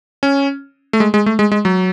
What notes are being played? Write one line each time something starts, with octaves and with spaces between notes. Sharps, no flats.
C#4
A3
G#3
G#3
A3
G#3
G#3
F#3